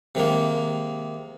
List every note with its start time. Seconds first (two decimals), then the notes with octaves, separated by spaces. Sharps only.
0.15 C3 D#3 G#3 A#3